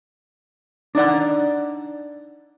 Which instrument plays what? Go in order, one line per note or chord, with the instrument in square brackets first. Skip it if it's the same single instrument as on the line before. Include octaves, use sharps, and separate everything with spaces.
[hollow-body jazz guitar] D4 D#4 D5 F#5